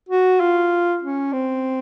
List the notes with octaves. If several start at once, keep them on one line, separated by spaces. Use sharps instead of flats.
F#4
F4
C#4
C4